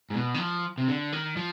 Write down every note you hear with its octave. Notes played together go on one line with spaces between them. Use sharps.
G#2
B2
D#3
F3
C3
D3
D#3
F3